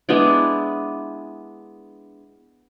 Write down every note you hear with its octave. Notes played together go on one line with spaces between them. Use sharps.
G#3 B3 D4 E4